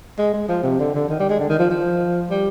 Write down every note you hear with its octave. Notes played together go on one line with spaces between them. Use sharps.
G#3
G#3
F3
C3
D3
D3
D#3
G3
G#3
D3
D#3
F3
F3
G3